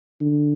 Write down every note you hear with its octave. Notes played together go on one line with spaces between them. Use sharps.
D3